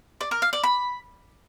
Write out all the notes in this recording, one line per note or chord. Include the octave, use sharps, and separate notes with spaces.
D5
A#4
F5
D5
B5